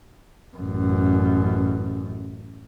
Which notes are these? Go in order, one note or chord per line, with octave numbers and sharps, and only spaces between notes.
A1 F#2